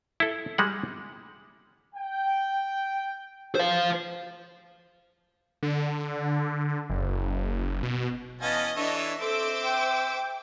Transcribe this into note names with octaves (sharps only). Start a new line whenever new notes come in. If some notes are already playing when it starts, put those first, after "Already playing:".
E4 A4
G3 G#3 F#5
G5
C5 F5
D3
F#1
B2
E3 B3 C#4 D#5 F5 A5
E3 D4 A4 C#5 E5
C4 A4 C5 D6 E6
G5